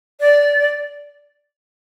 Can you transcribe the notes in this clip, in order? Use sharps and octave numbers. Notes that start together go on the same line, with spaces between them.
D5